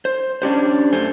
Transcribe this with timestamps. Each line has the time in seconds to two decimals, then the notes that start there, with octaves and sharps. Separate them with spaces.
0.05 C5
0.42 C#4 D4 G4 C5
0.93 F#2 A3 C5 G#5